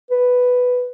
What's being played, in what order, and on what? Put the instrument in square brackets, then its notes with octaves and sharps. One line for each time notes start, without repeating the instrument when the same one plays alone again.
[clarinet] B4